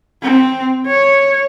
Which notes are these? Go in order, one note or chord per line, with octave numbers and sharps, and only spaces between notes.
C4
C#5